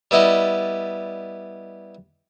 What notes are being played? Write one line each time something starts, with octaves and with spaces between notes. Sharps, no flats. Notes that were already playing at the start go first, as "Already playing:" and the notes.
G3 B3 E4 D5 D#5